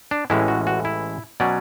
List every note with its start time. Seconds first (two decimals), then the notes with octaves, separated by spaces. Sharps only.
0.11 D4
0.30 A1 A2 E3 G#3 C#4 E4
0.48 F#4
0.67 F#4
0.85 E4
1.40 B2 F#3 C#4 D5